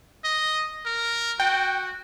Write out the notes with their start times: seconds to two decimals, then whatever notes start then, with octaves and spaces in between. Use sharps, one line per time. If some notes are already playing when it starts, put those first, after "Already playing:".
0.24 D#5
0.86 A#4
1.40 F#4 G5